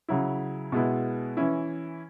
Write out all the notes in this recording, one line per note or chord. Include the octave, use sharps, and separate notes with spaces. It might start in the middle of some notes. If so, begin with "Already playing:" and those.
C#3 F#3 E4
B2 G#3 B3 E4
E3 C#4 E4